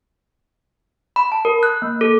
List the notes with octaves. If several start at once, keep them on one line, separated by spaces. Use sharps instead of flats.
B5
A5
A#4
F#6
A#3
A4